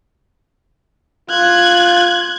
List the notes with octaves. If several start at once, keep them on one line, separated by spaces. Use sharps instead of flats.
F4 F#6 G#6